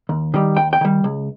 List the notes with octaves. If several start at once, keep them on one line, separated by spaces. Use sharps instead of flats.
D#2
D#3 G3
D#2 G5
G5
D#3 G3
C#2